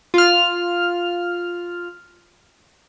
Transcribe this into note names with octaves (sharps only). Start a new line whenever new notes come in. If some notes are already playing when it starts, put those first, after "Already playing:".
F4 F6